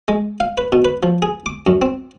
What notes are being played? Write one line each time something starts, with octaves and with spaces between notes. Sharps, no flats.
G#3
F5
B4
B2
B4
F3
G#4
D6
F#2
C4